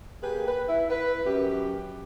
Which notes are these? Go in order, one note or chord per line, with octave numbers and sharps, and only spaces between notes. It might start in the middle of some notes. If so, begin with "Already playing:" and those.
A#3 G4 G#4 B4
B4
E4
B4
F#2 G4